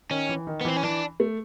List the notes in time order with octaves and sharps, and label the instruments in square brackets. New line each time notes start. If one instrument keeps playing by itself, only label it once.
[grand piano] D#3 [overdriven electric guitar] C#4
[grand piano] E3
D#3
[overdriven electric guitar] B3
[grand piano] E3 [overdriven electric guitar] C4
[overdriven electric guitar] C#4
[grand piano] E3 [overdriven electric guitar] D4
[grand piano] A3